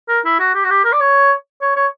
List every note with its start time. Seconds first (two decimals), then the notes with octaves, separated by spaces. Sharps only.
0.09 A#4
0.25 E4
0.39 F#4
0.55 G4
0.64 F#4
0.70 G4
0.85 A#4
0.93 D5
1.00 C#5
1.61 C#5
1.76 C#5